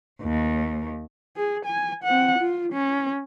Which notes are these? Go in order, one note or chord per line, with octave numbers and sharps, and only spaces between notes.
D#2
G#4
G#5
C4 F#5
F4
C#4